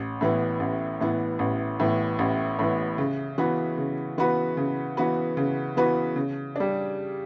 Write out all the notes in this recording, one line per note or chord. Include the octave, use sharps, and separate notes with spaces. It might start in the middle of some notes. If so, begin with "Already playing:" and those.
Already playing: A1
A2 E3 B3
A1
A2 E3 B3
A1
A2 E3 B3
A1
A2 E3 B3
C#3
E3 B3 F#4 B4
C#3
E3 B3 F#4 B4
C#3
E3 B3 F#4 B4
C#3
E3 B3 F#4 B4
C#3
G3 D4